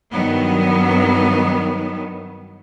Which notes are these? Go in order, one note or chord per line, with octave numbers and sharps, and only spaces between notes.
G2 D#3 F#3 B3